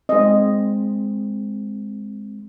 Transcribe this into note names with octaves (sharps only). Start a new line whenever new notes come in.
G#3 C4 D#5